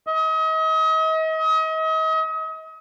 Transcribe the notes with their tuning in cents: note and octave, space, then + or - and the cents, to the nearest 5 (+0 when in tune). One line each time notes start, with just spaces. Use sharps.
D#5 +35